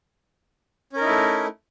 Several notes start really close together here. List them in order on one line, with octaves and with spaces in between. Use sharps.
C#4 A#4 D#4 E4 A3